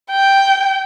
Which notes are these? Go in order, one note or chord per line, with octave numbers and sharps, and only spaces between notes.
G5